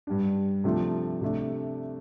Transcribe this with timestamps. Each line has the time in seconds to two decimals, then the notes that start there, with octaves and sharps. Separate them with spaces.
0.07 G2 G3 D4
0.64 C3 F3 A3 D4 F4
1.21 C3 A3 D4